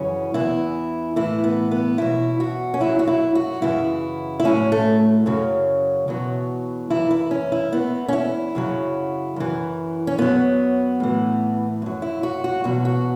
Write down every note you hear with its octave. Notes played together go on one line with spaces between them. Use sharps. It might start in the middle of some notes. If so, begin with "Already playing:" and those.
Already playing: F#2 C#3 E3 C#4
E2 E3 E4
A2 E3 E4
B3
B3
E2 B2 F#3 E4
F#4
C#4
F#2 F#3 E4
F#4
E4
F#4
F#2 C#3 E3 E4
E4
A2 F#3 C#4
A3
F#2 C#3 F#3
E2 B2 F#3
F#2 E3 E4
E4
C#4
E4
E2 E3 B3
C#4
E4
F#2 C#3 F#3
F#2 E3
C#4
F#2 F#3 B3
A2 E3
F#2 F#3
E4
F#4
F#4
E2 B2 F#3 F#4
F#4